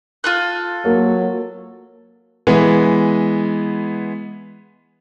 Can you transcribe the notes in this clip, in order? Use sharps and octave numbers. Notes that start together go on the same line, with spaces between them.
F4 A4 F#6
F#3 A#3
E3 G#3 B3